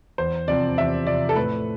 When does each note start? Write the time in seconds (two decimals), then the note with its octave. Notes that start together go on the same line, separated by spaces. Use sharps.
0.18 E2 C5
0.48 C3 F3 C4 D5
0.77 E2 E5
1.07 C3 F3 C4 D5
1.29 A4
1.36 A2 B4